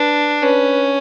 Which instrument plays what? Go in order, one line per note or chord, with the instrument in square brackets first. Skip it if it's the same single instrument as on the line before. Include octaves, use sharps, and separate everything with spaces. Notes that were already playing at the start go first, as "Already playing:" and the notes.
Already playing: [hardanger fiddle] D4 [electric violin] B4
[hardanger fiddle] C#4 [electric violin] B4